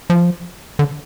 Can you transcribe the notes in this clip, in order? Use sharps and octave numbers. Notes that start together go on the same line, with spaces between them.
F3
D3